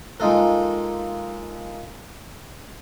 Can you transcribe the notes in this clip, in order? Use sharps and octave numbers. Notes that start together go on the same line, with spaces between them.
G#3 A#3 D#4 F4 A4 A#4